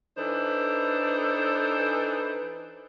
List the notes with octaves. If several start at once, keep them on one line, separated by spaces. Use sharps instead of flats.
E3 D4 D#4 A4 B4 C5